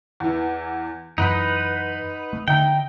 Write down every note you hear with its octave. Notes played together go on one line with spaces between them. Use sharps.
E2 E3
F#2 E3 D#4 B4 F#5 C6 B6
A3
D3 D#4 E5 G5 A#5